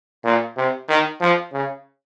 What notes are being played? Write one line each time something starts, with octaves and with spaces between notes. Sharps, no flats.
A#2
C3
D#3
F3
C#3